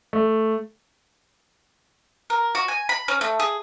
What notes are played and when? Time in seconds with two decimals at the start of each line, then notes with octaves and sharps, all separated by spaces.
0.13 A3
2.30 A#4
2.55 F#4
2.68 G#5
2.89 B5
3.08 C#4
3.21 A3
3.40 G#4